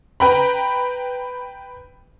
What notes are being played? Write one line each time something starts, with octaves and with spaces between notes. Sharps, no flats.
B4 G5 A#5 B5